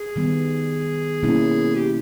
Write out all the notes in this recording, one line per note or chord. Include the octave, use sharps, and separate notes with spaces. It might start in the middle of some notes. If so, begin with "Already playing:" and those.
Already playing: G#4
D#3 G3 B3
B2 G3 A#3 C#4 E4
G4